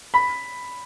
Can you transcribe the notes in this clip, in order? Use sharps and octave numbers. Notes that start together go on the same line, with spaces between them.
B5